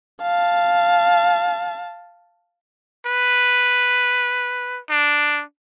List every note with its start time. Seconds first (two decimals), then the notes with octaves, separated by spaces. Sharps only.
0.22 F5 A5
3.06 B4
4.90 D4